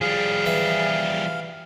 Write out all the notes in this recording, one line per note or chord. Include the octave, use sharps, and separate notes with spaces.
F3 G3 G#4 F5
E3 E5 B5